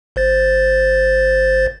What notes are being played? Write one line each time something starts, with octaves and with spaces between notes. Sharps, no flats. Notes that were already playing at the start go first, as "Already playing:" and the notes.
G1 C5 A6